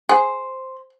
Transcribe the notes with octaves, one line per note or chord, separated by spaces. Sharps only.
G#4 C5